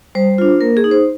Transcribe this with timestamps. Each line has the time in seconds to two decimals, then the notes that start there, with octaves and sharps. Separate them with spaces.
0.15 G3 C5
0.38 D4 F4
0.61 A#3 A#4
0.77 G#4
0.84 D#4
0.91 C5